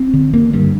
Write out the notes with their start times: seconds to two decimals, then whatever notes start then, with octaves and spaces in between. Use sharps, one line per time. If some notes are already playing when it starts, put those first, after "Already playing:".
Already playing: C4
0.14 D3
0.33 D3 A#3
0.53 G2 G3